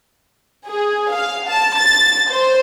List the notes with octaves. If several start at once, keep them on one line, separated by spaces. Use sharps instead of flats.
G#4
F5
A5
A6
C5